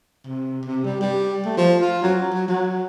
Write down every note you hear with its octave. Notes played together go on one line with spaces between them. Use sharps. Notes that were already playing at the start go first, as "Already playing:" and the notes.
C3
C3
G3
G3
A3
F3
F4
F#3
F#3
F#3